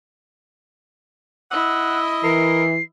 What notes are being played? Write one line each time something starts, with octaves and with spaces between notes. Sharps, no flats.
E4 D#5 F#5 E6
E3 A#4 C7